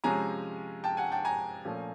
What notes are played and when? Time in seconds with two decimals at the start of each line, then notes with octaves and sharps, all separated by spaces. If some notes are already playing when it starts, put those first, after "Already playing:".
0.04 C3 F3 G#3 C#4 G#5 A#5
0.84 G5 A5
0.97 F#5 G#5
1.12 G5 A5
1.25 G#5 A#5
1.65 A#2 F3 A3 C#4